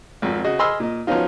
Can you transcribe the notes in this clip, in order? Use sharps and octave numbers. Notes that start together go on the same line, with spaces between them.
G#1 F2
C#3 F#4 D#5
G#4 D#5 B5 C6 E6 F6
A#2 D#5
F3 F#3 B3 C#4 D#4 F4